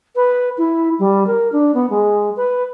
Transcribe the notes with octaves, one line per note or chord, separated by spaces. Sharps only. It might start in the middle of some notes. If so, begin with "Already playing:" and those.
B4
E4
G3
A#4
D4
B3
G#3
B4